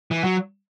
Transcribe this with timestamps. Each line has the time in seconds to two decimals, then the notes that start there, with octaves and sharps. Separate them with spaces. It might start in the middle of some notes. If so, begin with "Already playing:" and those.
0.11 E3
0.24 F#3